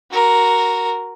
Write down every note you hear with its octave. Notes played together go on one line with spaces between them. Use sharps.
F#4 A#4